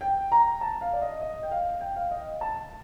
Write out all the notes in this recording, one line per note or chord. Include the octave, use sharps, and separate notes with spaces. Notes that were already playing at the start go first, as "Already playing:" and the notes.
G5
A#5
A5
F5
D5
D#5
D#5
G5
F5
G5
F5
D#5
A5